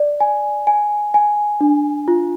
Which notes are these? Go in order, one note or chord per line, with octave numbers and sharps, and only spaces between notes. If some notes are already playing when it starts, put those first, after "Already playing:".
Already playing: D5
G#5
G#5
G#5
D4
F4